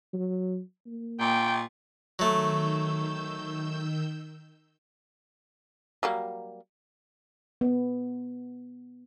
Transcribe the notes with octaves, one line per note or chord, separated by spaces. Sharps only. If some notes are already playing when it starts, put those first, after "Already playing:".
F#3
A#3
A#2 G5
D#3 F#3 A3 E6 G6
F#3 G3 A#3
B3